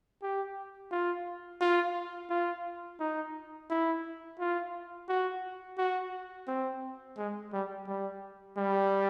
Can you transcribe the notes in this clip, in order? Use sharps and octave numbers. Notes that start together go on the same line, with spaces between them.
G4
F4
F4
F4
D#4
E4
F4
F#4
F#4
C4
G#3
G3
G3
G3